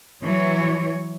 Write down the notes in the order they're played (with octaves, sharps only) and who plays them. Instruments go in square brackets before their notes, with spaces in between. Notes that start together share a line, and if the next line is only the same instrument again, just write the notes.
[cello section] E3 F#3 C#5